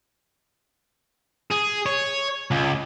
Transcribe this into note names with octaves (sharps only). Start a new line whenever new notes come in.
G#4
C#5
C#2